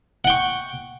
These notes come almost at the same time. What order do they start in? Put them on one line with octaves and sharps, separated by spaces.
F#5 G5 C#6